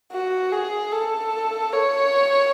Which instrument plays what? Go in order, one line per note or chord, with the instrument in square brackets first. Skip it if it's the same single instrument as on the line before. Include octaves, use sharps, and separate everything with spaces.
[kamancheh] F#4
G#4
A4
C#5